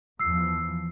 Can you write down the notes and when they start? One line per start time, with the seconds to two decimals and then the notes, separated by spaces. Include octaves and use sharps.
0.19 E2 F3 E6 C7